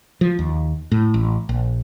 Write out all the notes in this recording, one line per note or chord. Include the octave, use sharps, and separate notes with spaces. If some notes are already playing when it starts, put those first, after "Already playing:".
F3
D#2
A2
A1
A#1